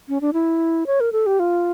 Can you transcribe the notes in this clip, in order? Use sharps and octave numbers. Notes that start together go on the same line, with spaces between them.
C#4
D4
E4
C#5
A#4
A4
G4
F4